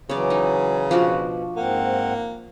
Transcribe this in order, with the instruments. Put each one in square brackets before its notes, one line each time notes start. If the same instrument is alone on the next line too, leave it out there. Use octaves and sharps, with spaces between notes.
[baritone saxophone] C#3 [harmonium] E3 F#3 [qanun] C#5 D5
[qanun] D#4
[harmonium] B2 [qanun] F3 D4 F#4
[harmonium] G#2 C4 F#5 [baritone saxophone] A#3